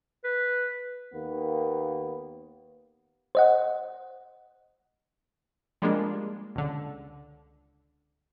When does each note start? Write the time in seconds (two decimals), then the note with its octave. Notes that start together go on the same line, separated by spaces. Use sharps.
0.24 B4
1.13 D#2 A#3 B3
3.35 C5 D#5 F#5
5.82 F3 G3 G#3 A#3 D4 F4
6.56 C#2 D3